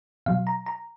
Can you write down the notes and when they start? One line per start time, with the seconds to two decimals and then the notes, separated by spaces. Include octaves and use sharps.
0.26 B2 F#3 F5
0.47 A#5
0.66 A#5